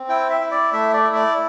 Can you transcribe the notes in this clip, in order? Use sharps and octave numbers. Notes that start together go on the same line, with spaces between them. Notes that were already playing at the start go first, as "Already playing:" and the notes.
Already playing: C4
E4 G5
E5
E4
D5
A3 E5
D5
E4
D5